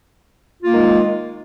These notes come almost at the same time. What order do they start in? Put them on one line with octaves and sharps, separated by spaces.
F4 A#3 D#3 G#3